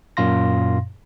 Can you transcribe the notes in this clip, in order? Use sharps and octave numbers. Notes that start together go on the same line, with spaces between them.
F#2 A#2 F5 C6 A#6